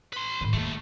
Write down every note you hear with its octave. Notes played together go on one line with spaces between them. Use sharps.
B4 C6
A2 D#3
D#2 D#3 G#3 A3